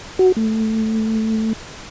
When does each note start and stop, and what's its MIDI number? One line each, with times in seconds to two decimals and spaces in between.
0.19 0.32 66
0.36 1.53 57